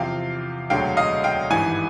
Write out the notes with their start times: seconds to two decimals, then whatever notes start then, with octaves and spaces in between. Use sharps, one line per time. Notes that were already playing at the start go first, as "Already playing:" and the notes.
Already playing: E2 C3 F3 F5 G5
0.70 E1 D2 D3 F#3 F5 G5
0.97 D#5 F5
1.24 F5 G5
1.50 G#1 G2 E3 G3 F#5 G#5